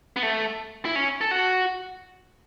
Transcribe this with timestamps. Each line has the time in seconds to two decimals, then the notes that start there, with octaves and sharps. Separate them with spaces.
0.16 B3
0.23 A3
0.85 E4
0.95 C#4
1.21 A4
1.31 F#4